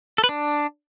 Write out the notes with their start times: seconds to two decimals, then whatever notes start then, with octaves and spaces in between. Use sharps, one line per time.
0.18 A4
0.24 B4
0.29 D4